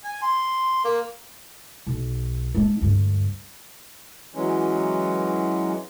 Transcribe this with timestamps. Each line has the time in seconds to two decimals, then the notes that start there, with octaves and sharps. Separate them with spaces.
0.04 G#5
0.22 C6
0.85 A#3
1.87 B1
2.55 G#3 D4
2.81 D2 G2
4.35 E3 F#3 G#3 C#4